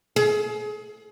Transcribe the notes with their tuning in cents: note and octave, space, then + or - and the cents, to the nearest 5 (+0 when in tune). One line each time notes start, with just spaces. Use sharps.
G#4 +30